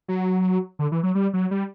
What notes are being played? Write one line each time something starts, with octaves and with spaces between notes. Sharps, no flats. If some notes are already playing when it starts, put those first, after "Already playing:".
F#3
D3
E3
F#3
G3
F#3
G3